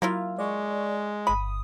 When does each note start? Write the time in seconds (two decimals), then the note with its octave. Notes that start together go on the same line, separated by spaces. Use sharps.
0.02 F#3 A#3 E4 F4
0.38 G#3 D5 C#6
1.27 G1 B5 D#6